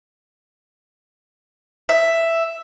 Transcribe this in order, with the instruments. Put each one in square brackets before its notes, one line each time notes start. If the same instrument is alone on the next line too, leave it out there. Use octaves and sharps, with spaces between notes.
[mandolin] E5